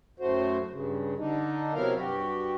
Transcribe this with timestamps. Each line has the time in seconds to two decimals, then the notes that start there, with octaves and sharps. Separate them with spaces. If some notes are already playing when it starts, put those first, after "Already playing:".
0.20 F#2 A2 A3 F#4 C5
0.71 G2 C#3
1.17 D3 D4 D#4
1.74 C3 F#3 B3 E4 A#4 F5
1.97 G2 F#4 G4